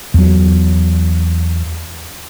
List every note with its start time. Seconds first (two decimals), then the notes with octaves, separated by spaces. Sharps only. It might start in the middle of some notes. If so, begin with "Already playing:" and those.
0.14 E2 F#3